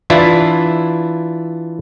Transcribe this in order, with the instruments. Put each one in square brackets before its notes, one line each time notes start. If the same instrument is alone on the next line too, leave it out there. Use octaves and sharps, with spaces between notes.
[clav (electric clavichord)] E3 D4 E4 F4